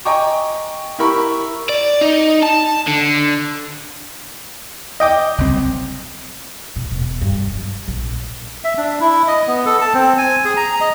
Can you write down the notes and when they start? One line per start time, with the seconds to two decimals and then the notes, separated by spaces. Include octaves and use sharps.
0.05 D#5 G5 G#5 A#5 C#6 D6
0.99 E4 G4 A#4 B5 C#6
1.69 D5
2.01 D#4
2.43 A5
2.87 D3
5.00 D#5 G5 D6
5.38 F#1 C2 C4
6.76 A#2
6.91 E1
7.21 G2
7.54 F#3
7.88 A#1
8.64 E5
8.77 D4
9.00 E4
9.28 D#5
9.47 B3
9.66 A4
9.81 A5
9.94 C4
10.18 G#5
10.45 G#4
10.57 A#5
10.81 D#5